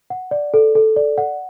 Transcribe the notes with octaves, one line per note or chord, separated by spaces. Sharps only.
F#5
D5
A4
A4
D5
F#5